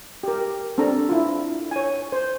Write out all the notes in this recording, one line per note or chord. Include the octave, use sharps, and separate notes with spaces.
G4 A#4
C4 D4 A4 A#5
E4 F4
C#5 G#5
C5